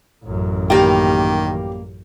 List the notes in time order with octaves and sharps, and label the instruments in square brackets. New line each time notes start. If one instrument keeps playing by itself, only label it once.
[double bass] A1 F#2
[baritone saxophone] D#3 [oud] G3 A#3 [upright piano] G4